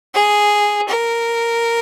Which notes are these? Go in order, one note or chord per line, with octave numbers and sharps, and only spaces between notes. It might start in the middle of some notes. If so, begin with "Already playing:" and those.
G#4
A#4